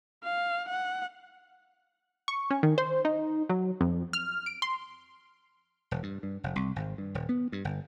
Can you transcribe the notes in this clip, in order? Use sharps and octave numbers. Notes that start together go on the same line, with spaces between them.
F5
F#5
C#6
C#4
D#3
C5
D#4
F#3
F2
F6
D7
C6
E1
G2
G2
F1
C2
G#1
G2
D#1
B3
G2
G1